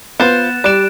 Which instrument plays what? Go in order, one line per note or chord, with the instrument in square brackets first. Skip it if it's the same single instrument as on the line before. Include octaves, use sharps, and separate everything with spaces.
[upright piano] B3 [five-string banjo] F4 C5 [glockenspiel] F#6 A6 E7
[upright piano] G3 E7 [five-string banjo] D5 [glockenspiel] F#6 D7